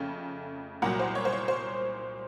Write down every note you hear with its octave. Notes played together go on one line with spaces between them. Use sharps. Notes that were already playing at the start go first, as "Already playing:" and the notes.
Already playing: F2 C#3 A3
C2 A#2 F#3 F#5 A#5
C5
C#5
C5
C#5
C5